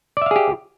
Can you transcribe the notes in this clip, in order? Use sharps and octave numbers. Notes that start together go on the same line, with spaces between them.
G4 G#4 D5 E5 F5